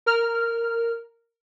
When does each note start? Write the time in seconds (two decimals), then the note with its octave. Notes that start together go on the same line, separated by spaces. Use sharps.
0.06 A#4 F6